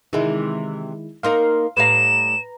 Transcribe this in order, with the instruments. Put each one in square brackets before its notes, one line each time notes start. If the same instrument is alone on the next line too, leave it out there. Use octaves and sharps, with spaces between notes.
[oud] C3 E3 [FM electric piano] D#3 G#3 E4
[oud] A#3 D#4 A#4 [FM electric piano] F5 C6
[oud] A2 G3 F5 [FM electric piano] B4 A#5 [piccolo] E7